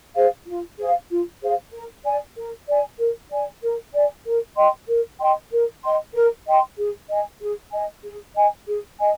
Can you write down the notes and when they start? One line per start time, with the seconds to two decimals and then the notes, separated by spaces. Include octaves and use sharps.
0.16 G#4 C5 F5
0.47 F4
0.78 G#4 C5 F5
1.10 F4
1.42 G#4 C5 F5
1.72 A#4
2.05 D5 G#5
2.36 A#4
2.68 D5 G#5
2.98 A#4
3.31 D5 G#5
3.62 A#4
3.94 D5 G#5
4.26 A#4
4.56 D#5 G5 C6
4.88 A#4
5.20 D#5 G5 C6
5.52 A#4
5.83 D#5 G5 C6
6.15 A#4
6.46 D#5 G5 C6
6.77 G#4
7.10 D#5 G#5
7.41 G#4
7.72 D#5 G#5
8.04 G#4
8.35 D#5 G#5
8.67 G#4
8.99 D#5 G#5